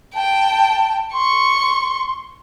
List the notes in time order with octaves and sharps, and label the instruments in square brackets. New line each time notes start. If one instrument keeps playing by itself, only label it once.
[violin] G5 [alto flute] A5
[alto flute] C6 [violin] C#6